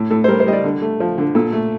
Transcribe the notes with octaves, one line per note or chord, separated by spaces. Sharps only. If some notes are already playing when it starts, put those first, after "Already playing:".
Already playing: A2
A2 A4
C5
G3 A#4
C5
G3 D#5
D5
D3
A3
F3
D3
A#2 A4
A3